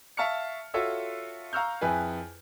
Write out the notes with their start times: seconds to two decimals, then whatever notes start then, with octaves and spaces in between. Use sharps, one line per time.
0.17 E5 F5 A5 C#6 F6 C#7
0.74 F4 F#4 A4 C#5 E5 E6
1.53 F5 A#5 C#6 E6 F6 G6
1.81 F2 E4 G#4 B4 G#5